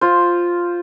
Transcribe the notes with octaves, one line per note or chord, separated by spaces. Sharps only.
F4 C5